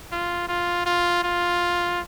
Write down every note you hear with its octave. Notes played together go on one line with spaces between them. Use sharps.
F4
F4
F4
F4